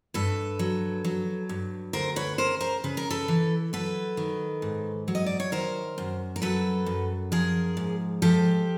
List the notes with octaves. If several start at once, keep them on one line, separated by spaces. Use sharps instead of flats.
G2 A4 B4
F#3
F#3
G2
D2 A#4 C5
B4 C#5
C#3 A#4 C5
A#4 C5
C#3 B4
A#4
A4 B4
E3
F#3 A4 B4
D#3
G#2
F#3
D#5
D5
C#5
D#3 A#4 C5
F#2
A#4
F#3 A4 B4
F#2
F3 G#4 A#4
G#2
F3 G4 A4